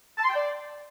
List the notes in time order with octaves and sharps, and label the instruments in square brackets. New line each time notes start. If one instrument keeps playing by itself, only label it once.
[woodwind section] A5
C6
G5
D5